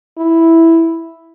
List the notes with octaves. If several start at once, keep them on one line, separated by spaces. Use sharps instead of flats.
E4